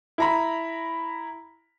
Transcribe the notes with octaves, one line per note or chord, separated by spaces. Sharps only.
E4 A#5 B5